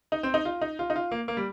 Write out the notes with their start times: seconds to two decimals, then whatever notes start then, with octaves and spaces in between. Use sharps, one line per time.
0.12 D#4
0.23 C4
0.34 D#4
0.45 F4
0.62 D#4
0.79 F4
0.90 D#4
0.96 F4
1.12 A#3
1.28 A#3
1.37 G3